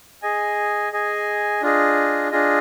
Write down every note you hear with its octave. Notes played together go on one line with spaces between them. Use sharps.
G#4 D#5 G#5
G#4 D#5 G#5
D4 F4 G#4 D#5
D4 F4 G#4 D#5